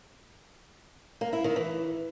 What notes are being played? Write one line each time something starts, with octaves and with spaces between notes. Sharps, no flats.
A#3
E4
D#3
E3